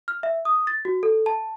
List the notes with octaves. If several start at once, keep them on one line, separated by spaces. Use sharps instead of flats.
F6
E5
D#6
A6
F#4
A4
A5